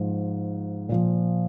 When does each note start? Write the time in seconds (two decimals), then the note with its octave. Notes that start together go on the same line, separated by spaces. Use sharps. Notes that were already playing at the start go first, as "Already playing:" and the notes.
Already playing: G#2 F3
0.89 A#2 F3